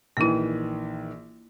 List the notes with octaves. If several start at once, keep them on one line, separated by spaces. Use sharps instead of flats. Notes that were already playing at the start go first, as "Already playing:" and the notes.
A#1 D#3 E3 A#3 E4